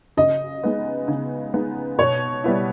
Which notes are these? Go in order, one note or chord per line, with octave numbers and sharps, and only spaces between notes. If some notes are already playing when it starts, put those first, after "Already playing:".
C#3 D#5
G#3 B3 D#4
C#3
G#3 B3 D#4
B2 C#5
G3 B3 E4